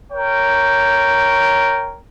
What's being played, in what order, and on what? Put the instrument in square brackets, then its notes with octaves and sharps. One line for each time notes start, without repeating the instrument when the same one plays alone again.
[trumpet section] A#4 C#5 G5